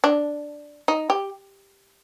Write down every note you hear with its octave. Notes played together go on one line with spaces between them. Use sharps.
D4
D#4
G4